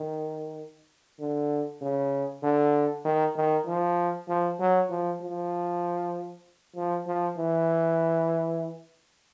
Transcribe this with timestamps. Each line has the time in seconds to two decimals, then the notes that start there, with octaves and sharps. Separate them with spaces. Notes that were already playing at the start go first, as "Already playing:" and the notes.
Already playing: D#3
1.20 D3
1.82 C#3
2.43 D3
3.05 D#3
3.36 D#3
3.67 F3
4.29 F3
4.60 F#3
4.90 F3
5.22 F3
6.76 F3
7.07 F3
7.38 E3